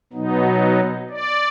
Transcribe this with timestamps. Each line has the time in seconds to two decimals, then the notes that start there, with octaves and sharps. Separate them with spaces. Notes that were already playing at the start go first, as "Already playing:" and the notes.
0.13 B2 F#3 B3 D#4
1.10 D5